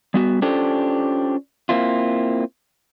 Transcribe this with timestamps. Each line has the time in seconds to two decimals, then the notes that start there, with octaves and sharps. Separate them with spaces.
0.14 G3 B3 F#4
0.42 C#4 D4 F4 G4 A4 C5
1.69 A#3 C4 E4 F4